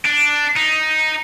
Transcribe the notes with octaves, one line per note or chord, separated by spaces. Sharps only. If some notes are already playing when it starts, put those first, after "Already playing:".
D4
D#4